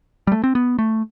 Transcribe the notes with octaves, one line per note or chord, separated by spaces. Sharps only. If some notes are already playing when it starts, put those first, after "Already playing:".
G3
A3
C4
B3
A3